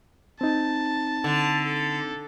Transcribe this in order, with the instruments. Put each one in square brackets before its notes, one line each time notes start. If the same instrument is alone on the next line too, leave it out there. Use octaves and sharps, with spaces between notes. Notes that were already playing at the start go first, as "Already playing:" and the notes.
[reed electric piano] C4 D#4 [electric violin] A5
[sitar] D3
[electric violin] A4